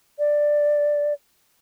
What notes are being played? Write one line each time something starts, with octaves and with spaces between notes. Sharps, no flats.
D5